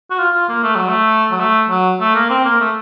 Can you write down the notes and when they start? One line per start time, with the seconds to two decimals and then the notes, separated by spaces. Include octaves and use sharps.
0.11 F#4
0.19 F4
0.34 F4
0.49 A#3
0.63 A3
0.75 F#3
0.88 A3
1.31 F#3
1.40 A3
1.69 F#3
2.01 A3
2.15 A#3
2.30 C4
2.45 A#3
2.60 A3